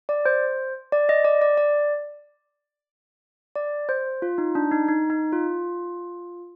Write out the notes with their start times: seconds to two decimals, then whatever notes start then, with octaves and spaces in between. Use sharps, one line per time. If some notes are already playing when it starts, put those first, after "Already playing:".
0.09 D5
0.26 C5
0.92 D5
1.09 D#5
1.24 D5
1.42 D5
1.57 D5
3.55 D5
3.89 C5
4.22 F4
4.38 D#4
4.55 D4
4.72 D#4
4.88 D#4
5.10 D#4
5.32 F4